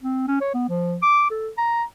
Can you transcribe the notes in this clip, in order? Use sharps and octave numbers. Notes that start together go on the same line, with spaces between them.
C4
C#4
C#5
B3
F3
D6
A4
A#5